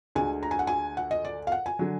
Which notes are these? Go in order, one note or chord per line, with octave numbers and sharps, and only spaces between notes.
D2 D3 G#3 G#5
A#5
G#5
F#5
G#5
F#5
D#5
D5
F5
F#5
G#5
D3 F#3